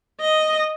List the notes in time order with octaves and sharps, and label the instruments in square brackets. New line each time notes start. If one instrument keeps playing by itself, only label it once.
[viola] D#5